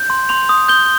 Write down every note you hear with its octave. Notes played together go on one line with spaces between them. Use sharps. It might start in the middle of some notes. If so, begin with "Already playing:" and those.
Already playing: G6
C6
C6 F7
D#6
G6 G7